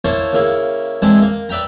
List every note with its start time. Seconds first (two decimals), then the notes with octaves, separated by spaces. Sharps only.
0.05 A#3 E4 C5 C#5 A5
0.33 C#3 A#3 E4
1.02 E3 G#3 C4 D4 E4
1.22 A#3
1.49 B4 D5 E5 G5 A#5